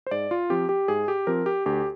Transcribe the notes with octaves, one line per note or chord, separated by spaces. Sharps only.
C5
G#2 D5
F4
F3 C4 G4
G4
G#2 G#4
G4
F3 C4 A#4
G4
D2 G4